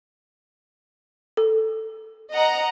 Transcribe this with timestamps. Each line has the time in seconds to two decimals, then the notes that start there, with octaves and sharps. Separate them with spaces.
1.37 A4
2.33 D#5 F#5 A#5